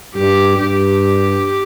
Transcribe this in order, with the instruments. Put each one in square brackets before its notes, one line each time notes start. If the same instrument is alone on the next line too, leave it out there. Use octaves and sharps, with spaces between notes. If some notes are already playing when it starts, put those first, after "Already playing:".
[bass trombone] G2 [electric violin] G4
[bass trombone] G2 [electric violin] G4